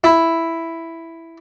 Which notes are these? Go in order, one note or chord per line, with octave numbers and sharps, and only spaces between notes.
E4